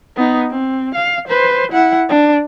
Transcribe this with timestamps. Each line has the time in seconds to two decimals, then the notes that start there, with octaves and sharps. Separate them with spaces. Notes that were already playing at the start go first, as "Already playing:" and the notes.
0.16 B3 D#4
0.50 C4
0.95 F5
1.28 B4 C5
1.72 E4 F#5
2.09 D4